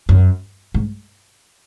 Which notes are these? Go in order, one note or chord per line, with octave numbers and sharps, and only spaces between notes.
F#2
G#2